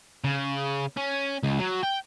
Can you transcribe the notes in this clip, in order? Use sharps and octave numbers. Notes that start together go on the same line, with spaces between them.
C#3
C#4
C#2
F#3
G5